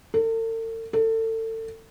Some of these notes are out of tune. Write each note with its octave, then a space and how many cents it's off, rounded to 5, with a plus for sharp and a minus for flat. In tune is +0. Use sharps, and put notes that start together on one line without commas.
A4 +45
A4 +30